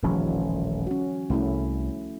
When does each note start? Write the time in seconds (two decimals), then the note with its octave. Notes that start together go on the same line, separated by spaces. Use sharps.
0.03 D#1 A1 D#3 F3 G3 C#4
0.87 C#4 F#4
1.30 C2 A3 C#4 E4